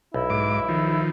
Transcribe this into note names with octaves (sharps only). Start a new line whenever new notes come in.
B1 E4
G#2 D6
D#3 F3